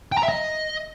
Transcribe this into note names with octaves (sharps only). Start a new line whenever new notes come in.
G5
A#5
E5
D#5